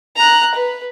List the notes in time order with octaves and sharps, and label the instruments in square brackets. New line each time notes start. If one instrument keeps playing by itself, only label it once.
[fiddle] A#5 F#6
B4